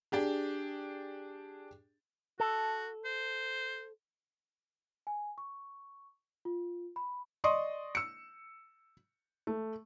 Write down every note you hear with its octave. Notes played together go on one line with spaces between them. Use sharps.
D4 G4 G#4
F#4 A4
C5
G#5
C#6
F4
B5
D5 D#5 C6 C#6 D#6
E6 C#7
A3